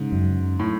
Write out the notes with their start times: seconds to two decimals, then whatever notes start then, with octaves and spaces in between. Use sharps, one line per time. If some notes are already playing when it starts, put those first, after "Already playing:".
Already playing: G#2 C#3
0.12 F#2
0.59 A2